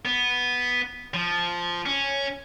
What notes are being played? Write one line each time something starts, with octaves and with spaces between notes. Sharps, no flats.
B3
F3
C#4